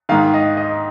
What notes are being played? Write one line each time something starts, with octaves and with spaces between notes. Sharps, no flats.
G#2 D#3 F5
D#5
D#5